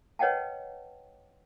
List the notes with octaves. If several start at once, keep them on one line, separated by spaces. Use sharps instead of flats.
B4 C#5 D#5 F#5 G5 A5